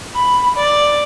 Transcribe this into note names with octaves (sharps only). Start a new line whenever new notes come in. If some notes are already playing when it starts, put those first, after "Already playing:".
B5
D5